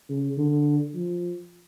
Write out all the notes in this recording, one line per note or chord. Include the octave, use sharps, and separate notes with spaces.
C#3
D3
F3